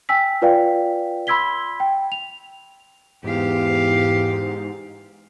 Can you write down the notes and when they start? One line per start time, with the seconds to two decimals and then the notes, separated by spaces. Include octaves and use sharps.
0.09 G5 G#5 E6 B6
0.42 F4 B4 D5 F5 G5
1.27 B5 C6 E6 G#6 B6 G7
1.80 G5
2.12 F7
3.24 E2 G#2 G4 F5